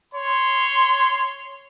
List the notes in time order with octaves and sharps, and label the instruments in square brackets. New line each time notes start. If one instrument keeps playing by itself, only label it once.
[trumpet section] C#5 C6